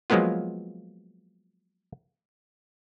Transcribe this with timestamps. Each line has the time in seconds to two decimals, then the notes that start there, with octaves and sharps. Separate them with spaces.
0.10 F3 F#3 G#3 A#3 B3 F4